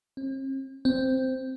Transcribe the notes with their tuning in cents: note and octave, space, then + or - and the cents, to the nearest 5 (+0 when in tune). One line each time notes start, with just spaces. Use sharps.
C4 +45
C4 -5